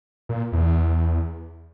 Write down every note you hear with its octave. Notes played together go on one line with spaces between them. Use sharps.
A#2
E2